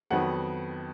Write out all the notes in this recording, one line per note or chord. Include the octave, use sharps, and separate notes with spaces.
F2 D#3 F#3 B3 F#5